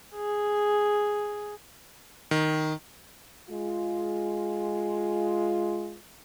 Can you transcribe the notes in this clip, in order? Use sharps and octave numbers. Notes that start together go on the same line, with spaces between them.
G#4
D#3
G#3 F4